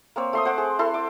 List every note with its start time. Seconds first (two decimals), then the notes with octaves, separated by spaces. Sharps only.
0.16 A#3 C4 C#5
0.33 A3 C6 D#6
0.45 C5 F#5 D6
0.58 G#4
0.79 E4 A4 C6
0.94 D6